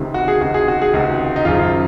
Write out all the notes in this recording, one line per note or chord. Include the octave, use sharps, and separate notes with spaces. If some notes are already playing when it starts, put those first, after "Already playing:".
Already playing: C#2 C3 D#3
F#4
G#4
C#2 C3 D#3 F#4
G#4
F#4
G#4
C#2 C3 D#3 F#4
D#4
G#1 F#2 C#3 F4